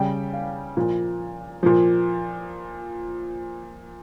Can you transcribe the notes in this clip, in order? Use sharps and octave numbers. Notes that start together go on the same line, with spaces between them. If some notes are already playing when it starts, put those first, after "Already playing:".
Already playing: C#3 G3 G5
F5
A#2 F3
A#2 F3